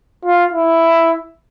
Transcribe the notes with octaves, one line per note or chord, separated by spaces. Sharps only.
F4
E4